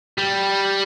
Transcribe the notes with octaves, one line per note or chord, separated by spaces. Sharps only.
G3